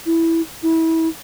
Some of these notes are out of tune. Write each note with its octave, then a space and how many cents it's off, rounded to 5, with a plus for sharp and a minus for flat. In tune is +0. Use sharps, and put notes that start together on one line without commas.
E4 +0
E4 -25